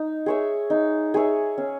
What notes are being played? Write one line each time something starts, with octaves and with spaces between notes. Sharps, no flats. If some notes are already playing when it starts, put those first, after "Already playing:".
Already playing: D#4
G#4 C#5 E5
D#4
G#4 C#5 E5
C#4